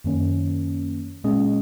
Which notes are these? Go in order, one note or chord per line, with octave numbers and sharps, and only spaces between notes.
F#2 D#3 A#3 C#4
A#2 G#3 C#4 G#4 D#5